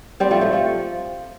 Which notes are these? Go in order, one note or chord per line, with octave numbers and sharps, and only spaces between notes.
G3 C4
F3 A3
F3 A3
F3 A3